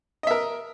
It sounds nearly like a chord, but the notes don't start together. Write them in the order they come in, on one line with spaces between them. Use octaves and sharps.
D#5 E5 A#4